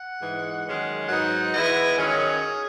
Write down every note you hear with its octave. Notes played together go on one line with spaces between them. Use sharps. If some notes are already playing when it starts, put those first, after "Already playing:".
Already playing: F#5
G#2 E3 G#3
F#2 D#3 G#3 C#4
G#2 F#3 B3 D#4 F#5
E3 G#3 B3 E4 D#5
F#2 D#3 F#3 C#4 G#4